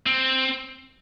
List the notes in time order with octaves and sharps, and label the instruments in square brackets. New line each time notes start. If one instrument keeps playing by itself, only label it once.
[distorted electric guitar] C4